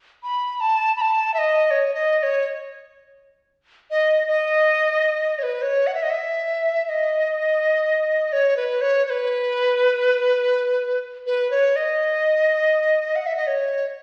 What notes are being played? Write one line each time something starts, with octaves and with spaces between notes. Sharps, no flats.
B5
A5
B5
A5
E5
D#5
C#5
D#5
D#5
C#5
D#5
D#5
C#5
B4
C#5
F#5
E5
D#5
E5
E5
D#5
C#5
B4
C#5
C#5
B4
B4
C#5
D#5
F#5
E5
D#5
C#5